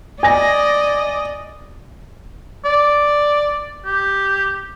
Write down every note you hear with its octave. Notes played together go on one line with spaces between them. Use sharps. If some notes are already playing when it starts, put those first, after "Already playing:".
D5 D#5 G#5 A#6
D5
G4